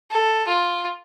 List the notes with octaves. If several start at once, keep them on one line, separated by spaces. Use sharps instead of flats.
A4
F4